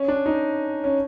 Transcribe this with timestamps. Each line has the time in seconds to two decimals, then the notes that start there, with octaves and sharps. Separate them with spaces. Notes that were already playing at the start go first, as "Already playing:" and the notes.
Already playing: C#4
0.08 D4
0.26 D#4
0.84 C#4